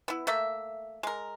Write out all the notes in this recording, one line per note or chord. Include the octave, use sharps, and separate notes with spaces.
B3 E4
A3 A#3 E5
G#3 A#4